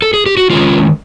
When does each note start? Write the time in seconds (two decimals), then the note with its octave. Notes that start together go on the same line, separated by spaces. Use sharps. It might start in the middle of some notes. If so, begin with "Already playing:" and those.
0.02 A4
0.14 G#4
0.26 G4
0.37 F#4
0.50 D#3 G#3 C#4 F4